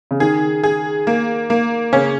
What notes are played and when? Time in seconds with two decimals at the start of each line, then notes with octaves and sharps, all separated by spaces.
0.11 C#3
0.20 D#3 G#4
0.63 G#4
1.07 A#3
1.50 A#3
1.93 C#3 C#4